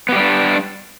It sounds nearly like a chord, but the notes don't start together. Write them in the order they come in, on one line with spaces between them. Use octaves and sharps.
B3 G4 G3 D4